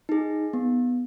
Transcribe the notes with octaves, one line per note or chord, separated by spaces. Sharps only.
D#4 G#4
B3